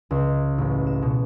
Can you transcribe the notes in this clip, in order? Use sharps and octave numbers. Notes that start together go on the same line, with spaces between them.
C#2
A1
E7
B2